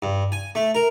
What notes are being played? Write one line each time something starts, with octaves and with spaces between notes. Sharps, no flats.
G2
G#5
A3
A#4